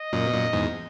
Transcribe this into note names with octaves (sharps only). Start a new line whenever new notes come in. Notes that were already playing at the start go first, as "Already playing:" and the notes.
Already playing: D#5
F#2 A#2
B2
F#2 A#2
E2 G#2